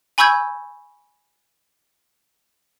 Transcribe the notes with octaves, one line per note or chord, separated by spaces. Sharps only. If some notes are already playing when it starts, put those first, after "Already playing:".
G#5 B5 C#6 E6 G6 G#6